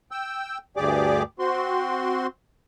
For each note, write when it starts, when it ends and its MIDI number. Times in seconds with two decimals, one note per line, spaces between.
0.11 0.58 79
0.11 0.58 88
0.77 1.23 38
0.77 1.23 43
0.77 1.23 67
0.77 1.23 68
0.77 1.23 74
0.77 1.23 86
1.39 2.27 60
1.39 2.27 66
1.39 2.27 84